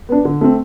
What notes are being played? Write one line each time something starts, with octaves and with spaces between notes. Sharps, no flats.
B3 D4
D3
A3 C4